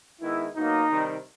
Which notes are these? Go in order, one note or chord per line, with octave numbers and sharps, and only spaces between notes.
D#3 G#3 B3 E4
B2 F#3 A#3 D#4
C3 D#3 G3